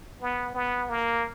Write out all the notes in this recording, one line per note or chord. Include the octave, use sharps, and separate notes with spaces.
B3
B3
A#3